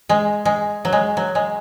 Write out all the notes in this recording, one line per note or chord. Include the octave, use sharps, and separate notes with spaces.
G#3
G#3
F#3
G#3
F#3
G#3